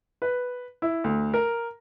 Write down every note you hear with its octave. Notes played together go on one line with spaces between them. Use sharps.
B4
E4
D2
A#4